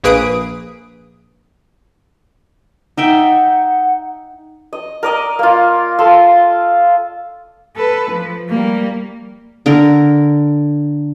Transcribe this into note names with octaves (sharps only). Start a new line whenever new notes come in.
A#1 A#3 G#4 B4 D#6 D7
D#4 E5 F#5 G5
D#5
A#4 D5 D#5
A#3 F4
F4 A4 F5 C6
A4 B4
F3
G3 A#3
D3 A#4